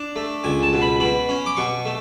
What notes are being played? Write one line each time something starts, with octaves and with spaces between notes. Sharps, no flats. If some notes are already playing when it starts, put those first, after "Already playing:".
Already playing: D4
A3
C#2 G#5
A5
B2
B5
B2 B5
C#4
D6
B2 C#6
A3